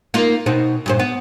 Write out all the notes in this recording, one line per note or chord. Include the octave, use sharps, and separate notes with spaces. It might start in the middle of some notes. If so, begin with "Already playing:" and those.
A#3 D#4 F4
B2 C4 D#4
G2 A#2 C5
B3